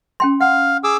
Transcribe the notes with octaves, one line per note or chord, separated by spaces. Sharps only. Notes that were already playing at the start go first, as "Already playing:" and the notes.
C#4 G5 C6
F5 F#5
G#4 D6 E6